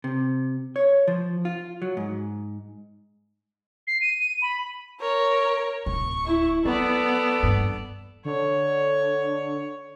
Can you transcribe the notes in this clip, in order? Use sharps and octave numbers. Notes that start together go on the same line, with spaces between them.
C3
C#5
F3
F4
F#3
G#2
C7
D#7
B5
A#4 C#5
D1 G#1 C#6
E4
F#3 B3 A4 D5
G2 A#3
D3 C#5